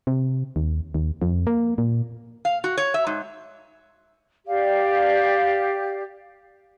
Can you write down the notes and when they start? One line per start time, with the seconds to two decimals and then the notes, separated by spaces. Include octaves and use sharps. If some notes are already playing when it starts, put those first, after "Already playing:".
0.07 C3
0.56 D#2
0.94 D#2
1.22 F2
1.47 A#3
1.78 A#2
2.45 F5
2.64 F#4
2.78 C#5
2.94 E5
3.07 G#2
4.47 G4 D5 F5